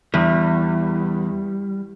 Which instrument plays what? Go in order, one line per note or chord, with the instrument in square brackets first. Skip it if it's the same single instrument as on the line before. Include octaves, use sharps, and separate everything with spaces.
[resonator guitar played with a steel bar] E2 [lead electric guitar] G3